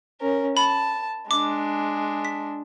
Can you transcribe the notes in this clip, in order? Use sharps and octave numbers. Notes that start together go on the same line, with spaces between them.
C#4 A#4
A5 B5
G#3 D4 D6
B6